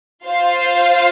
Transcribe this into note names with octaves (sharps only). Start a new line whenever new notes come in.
F4 C5 F5